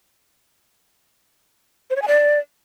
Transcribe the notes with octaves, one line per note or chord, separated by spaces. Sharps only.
C5
C#5
G#5
D5